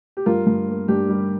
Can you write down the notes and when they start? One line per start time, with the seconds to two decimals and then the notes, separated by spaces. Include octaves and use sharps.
0.17 G4
0.26 G2 F4 A#4
0.47 G2
0.68 A#3
0.88 G2 D4 G4
1.09 G3